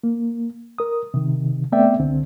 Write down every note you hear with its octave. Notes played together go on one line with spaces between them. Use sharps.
A#3
A#4 D#6
C3 D#3
A3 B3 C4 D5 E5 G5
C2 D3 C4